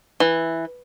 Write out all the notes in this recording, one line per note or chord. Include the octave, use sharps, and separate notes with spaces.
E3